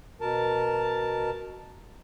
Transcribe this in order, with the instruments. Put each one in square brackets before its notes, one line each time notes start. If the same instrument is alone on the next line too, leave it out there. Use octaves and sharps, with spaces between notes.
[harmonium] B2 A#4 A5